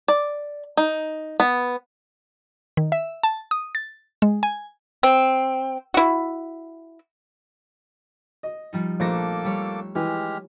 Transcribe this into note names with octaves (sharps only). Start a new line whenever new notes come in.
D5
D#4
B3
D#3
E5
A5
D#6
A6
G#3
G#5
C4
E4 F#4
D#5
F3 G3 D#4
A#1 A3 A#3 A4 D6 A#6
G3 C#5 E6
E3 G#3 G4 F6